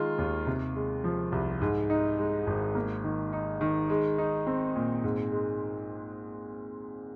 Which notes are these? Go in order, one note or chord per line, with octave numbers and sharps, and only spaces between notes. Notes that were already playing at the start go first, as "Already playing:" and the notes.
Already playing: D#3 G#3 F4
D#2
C3
G#3
F3
C2
G#2
D#4
G#3
G#1
A#3
D#3
D#4
D#3
G#3
D#4
C4
A#2
G#2
G#3